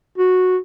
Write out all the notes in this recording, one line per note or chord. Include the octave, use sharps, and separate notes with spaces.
F#4